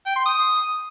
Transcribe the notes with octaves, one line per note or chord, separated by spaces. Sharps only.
G5
C6
D#6